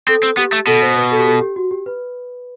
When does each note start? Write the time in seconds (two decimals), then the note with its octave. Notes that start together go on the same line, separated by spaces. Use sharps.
0.08 C4 A4
0.23 C4
0.37 B3 G4
0.53 A3
0.67 B2 A4
0.82 C5
0.96 B4
1.12 A4
1.19 G4
1.26 A4
1.41 G4
1.56 F#4
1.71 G4
1.86 B4